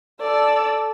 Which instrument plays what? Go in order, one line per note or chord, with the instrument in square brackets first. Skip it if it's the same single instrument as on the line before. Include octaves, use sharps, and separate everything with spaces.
[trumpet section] A4 [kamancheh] D5 E6